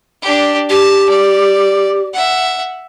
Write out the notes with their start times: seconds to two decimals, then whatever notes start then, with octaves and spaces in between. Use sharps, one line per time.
0.22 D4 G4
0.69 G4 A5
1.09 D5
2.13 E5 F#5